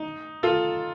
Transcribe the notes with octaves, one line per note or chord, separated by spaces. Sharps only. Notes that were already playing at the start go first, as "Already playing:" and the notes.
Already playing: D#4
F4 A4